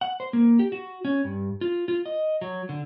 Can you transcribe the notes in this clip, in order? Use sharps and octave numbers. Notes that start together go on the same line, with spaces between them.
F#5
C5
A#3
G4
F#4
C#4
G2
F4
F4
D#5
F#3
D3